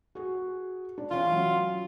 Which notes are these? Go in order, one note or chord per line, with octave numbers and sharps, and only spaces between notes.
F#4 G#4
D4
E3 C#4 F4
F#3